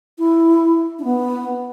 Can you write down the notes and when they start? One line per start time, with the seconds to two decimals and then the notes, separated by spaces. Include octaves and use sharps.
0.19 E4
0.99 D4
1.04 B3